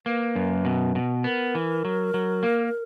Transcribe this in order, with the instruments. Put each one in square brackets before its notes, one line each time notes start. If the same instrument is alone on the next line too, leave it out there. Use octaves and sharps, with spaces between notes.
[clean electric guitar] A#3 [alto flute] B4
[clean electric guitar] F#2
B2
B2
[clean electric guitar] B3 [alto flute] A#4
[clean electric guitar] E3
F#3
F#3
A#3